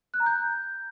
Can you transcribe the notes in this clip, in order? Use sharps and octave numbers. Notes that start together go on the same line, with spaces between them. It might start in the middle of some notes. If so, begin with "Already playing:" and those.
F#6
A#5
G6